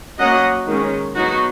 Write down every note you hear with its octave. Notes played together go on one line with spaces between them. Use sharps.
F#3 A#3 C#4 D#5 F#5
D#3 G#3 C#4
F#3 B3 D#4 F#4